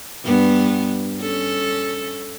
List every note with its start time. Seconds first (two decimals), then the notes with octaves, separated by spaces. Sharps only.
0.25 G2 B3
1.21 C#4 A4